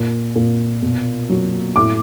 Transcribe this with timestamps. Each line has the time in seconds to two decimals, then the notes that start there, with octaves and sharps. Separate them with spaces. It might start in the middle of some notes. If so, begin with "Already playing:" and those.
Already playing: A#2
0.36 A#2
0.82 B2
1.29 F#3
1.76 A2 D6